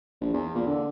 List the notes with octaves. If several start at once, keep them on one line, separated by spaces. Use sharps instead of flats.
A#1
E2
A#2
D3